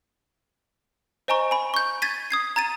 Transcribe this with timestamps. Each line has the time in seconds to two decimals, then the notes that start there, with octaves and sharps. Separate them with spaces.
1.28 C5 D#5 G#5 A#5 C#6
1.51 G#5 B5
1.74 C#6 G6
2.02 G#6 A6 B6 D#7
2.30 D#6 G#6 C7
2.56 A#5 G#6 A6 D#7